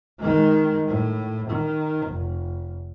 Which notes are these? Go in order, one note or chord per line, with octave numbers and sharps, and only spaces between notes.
D#3 G#3
A2
D#3
F1